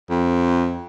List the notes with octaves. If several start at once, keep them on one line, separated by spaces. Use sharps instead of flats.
F2